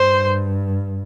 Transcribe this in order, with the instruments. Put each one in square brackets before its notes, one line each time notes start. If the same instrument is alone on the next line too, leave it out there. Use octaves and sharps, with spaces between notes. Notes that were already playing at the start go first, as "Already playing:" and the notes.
Already playing: [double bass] G2 [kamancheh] C5